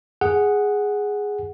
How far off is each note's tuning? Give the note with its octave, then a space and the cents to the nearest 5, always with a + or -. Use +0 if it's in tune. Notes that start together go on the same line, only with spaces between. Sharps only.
G#4 +0 F#5 +0